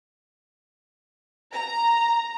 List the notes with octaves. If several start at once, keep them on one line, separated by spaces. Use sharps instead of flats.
A#5